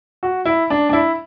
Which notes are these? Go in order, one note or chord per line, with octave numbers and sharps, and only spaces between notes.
F#4
E4
D4
D4
E4